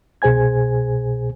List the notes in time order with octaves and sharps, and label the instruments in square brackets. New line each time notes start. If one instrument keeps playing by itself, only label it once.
[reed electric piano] C2 B2 G#4 C5 G#5 G#6